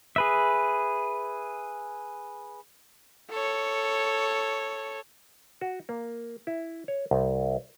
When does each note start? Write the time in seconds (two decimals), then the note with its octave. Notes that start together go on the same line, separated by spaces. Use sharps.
0.16 G#4 B4 E5
3.30 A4 C#5
5.61 F#4
5.89 A#3
6.47 E4
6.88 C#5
7.11 C2